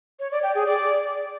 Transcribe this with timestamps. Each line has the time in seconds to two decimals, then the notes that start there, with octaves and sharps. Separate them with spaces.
0.20 C#5
0.31 D5
0.43 G5
0.55 G#4
0.67 D5